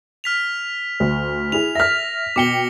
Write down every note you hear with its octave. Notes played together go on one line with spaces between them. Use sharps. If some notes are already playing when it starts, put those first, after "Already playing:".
F6 B6 F7
D2
E4 G#4 F7
E5 F6 A#6 B6
B2 G5 D6 C#7 G7